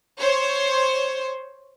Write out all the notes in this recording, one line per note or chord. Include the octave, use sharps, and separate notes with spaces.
C5 C#5